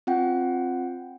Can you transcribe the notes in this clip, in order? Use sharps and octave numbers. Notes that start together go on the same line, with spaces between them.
C4 F4 F#5 G5